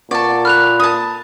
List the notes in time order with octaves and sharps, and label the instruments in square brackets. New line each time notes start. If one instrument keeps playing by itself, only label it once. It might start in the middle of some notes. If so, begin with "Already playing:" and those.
[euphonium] A#2 [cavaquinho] D5 A5 [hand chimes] F#5 C#6
[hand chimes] A4 B5 [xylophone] F6 F#6 F7
[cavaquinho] A5 D#6